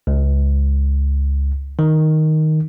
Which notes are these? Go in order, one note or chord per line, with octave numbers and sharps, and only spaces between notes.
C#2
D#3